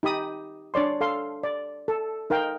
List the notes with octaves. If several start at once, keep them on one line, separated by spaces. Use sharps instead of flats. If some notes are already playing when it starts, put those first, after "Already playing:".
D#4 G4 B5 D#6
D4 C#5 D5 C6
A4 F5 C6
D5
A4
D#4 A#4 F5 G5